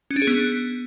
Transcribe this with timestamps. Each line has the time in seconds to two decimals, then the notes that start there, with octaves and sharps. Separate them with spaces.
0.11 C#4
0.16 D4
0.22 G#4
0.27 B3